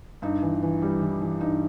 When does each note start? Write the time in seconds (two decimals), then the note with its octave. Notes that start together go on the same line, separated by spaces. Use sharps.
0.22 G2 D#4
0.42 E3
0.62 E3
0.82 G3
1.01 E3
1.21 E3
1.41 G2 D#4